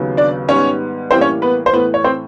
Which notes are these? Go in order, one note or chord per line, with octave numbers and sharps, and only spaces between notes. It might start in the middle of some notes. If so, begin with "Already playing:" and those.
Already playing: D#2 C#3 F#3 B3
D4 D5
G#2 D#3 G3 B3 C#4 C#5
A2 E3 G3 A#3 C4 C5
C#4 C#5
B3 B4
C5
A2 E3 A3 B3 B4
C#5
C4 C5